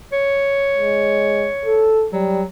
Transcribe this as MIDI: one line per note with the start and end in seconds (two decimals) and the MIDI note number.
0.13 1.97 73
0.76 1.48 56
1.65 2.07 69
2.13 2.46 54
2.13 2.42 55